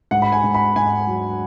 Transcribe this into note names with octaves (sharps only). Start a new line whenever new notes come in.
G#2 F#5
B5
G#5
G#2
B5
G#2 G#5
F#3